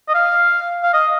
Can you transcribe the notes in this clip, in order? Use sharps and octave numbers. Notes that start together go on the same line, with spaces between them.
D#5
F5
F5
D#5